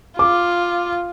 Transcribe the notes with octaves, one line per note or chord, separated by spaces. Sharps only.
F4 D6